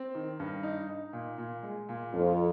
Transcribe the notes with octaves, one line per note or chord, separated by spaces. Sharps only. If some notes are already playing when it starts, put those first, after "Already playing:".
Already playing: C4
D#3
G2
D#4
D#4
A#2
A#2
G#3
A#2
F2 F4